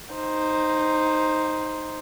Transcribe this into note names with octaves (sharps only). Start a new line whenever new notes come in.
D#4 C5